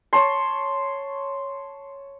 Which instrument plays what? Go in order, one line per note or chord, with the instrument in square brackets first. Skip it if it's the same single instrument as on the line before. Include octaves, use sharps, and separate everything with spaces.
[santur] C#5 A5 C6